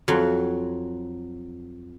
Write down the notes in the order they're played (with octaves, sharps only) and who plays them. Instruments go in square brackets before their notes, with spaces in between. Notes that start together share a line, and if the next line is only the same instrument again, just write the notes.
[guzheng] F2 F#3